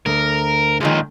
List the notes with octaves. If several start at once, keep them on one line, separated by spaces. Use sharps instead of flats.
D2 A#4
C#2 A#2 D#3 F3 G#3